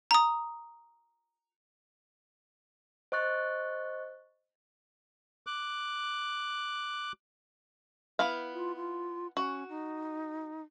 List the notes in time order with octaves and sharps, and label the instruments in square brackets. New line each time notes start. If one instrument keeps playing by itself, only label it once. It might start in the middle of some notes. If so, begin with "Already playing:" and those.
[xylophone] A#5 D#6
[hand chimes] C5 D#5 C#6 F#6 A6
[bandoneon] D6 F#6
[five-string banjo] B3 E4 F5
[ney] F4
F4
[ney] C#4 [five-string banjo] F#4
[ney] D#4